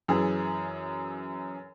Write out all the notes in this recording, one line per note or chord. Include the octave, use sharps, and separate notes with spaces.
F#2 E3 G#4